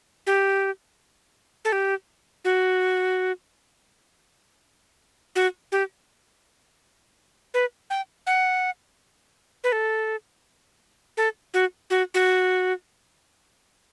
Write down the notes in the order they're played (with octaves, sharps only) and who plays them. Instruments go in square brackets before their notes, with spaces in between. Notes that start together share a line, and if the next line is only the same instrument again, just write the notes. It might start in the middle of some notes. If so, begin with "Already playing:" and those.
[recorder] G4
A4
G4
F#4
F#4
G4
B4
G5
F#5
B4
A4
A4
F#4
F#4
F#4